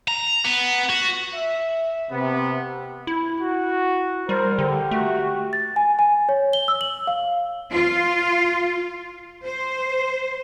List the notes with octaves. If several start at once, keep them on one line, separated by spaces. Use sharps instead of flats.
A#5
B3
F#4
E5
C3 B3
E4
F#4
G3 A#4 C5
D3 G4
A3 F#4
A6
G#5
G#5
C#5
G7
E6
F#7
F5
F4
C5